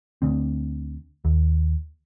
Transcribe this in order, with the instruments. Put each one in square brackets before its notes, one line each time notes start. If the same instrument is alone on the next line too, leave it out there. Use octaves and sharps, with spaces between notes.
[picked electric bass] D2 D3 C4
D#2